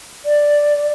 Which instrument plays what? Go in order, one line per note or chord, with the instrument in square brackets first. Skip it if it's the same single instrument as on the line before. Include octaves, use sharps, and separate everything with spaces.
[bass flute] D5